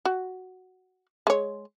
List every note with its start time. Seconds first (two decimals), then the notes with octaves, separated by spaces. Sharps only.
0.05 F#4
1.27 G#3 C#5